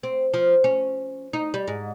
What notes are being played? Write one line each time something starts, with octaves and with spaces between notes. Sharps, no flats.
C4
F3
C#4
D#4
G3
G#2